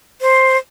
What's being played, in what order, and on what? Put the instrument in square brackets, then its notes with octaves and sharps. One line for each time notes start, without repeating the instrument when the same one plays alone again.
[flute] C5